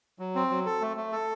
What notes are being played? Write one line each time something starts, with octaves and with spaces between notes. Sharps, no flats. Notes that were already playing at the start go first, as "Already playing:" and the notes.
F#3
C4
F#3
A4
A3
A3
A4